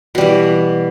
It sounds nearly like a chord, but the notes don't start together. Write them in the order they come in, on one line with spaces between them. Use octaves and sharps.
B2 G3 E3